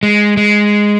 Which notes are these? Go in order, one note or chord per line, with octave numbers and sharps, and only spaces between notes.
G#3
G#3